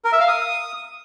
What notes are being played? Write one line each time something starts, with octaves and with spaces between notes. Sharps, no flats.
A#4
E5
F5
D#6